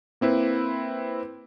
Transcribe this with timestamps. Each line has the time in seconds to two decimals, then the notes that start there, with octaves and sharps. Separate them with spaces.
0.21 A#3 C4 E4 B4